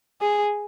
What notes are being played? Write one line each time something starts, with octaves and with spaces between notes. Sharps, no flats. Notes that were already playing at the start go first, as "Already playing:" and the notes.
G#4